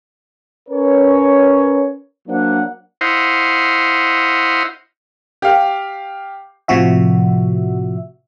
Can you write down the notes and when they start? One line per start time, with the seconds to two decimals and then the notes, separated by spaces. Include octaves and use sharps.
0.69 C#4 A#4 B4 C#5
2.28 F#3 A#3 D4 C5 F#5
3.01 E4 C5 D#5 F5 F#5 C6
5.42 G4 F5
6.68 A2 C3 F3 F#4 E5